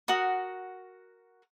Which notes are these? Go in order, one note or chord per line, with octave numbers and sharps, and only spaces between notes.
F#4 A#4 F#5 D#6